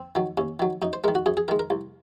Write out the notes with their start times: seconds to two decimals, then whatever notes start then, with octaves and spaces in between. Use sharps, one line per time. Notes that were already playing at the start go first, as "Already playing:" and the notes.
Already playing: C4
0.15 D#3 F#3
0.37 D#2 C#4
0.60 D#3 F#3
0.82 F#2 D#4
0.93 C5
1.04 D#3 G#3 A#4
1.15 F#4
1.26 F#2 G#4
1.37 G#4
1.48 D#3 G#3 A#4
1.59 A#4
1.70 C2